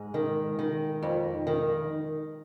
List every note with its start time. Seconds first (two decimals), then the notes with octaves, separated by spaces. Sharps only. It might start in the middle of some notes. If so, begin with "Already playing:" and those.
Already playing: G#2 G#3
0.14 D#3
0.59 D#3
1.03 F2
1.47 D#3